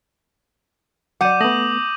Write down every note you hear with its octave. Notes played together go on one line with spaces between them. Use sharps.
F#3 D5 F#5 D6 G6 D#7
A3 B3 D#6 A#6 F#7